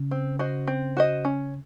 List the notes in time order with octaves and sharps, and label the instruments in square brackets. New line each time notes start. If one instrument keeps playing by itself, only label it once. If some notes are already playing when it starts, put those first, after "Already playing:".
Already playing: [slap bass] C#3
[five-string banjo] C4
F#4 C5 D#5
C4
F#4 C5 D#5
C#4